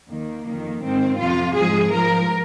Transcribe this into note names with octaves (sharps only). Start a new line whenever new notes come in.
D#2 D#3 A#3
F2 D#3
G#2 D#3 C4
F2 C3 F3 F4
G#2 F3 G#4
G#2 F3 A#4